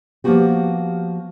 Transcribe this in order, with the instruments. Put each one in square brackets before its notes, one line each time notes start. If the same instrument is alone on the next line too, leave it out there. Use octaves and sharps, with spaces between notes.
[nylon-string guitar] F3 A#3 B3 D#4 F#4 G4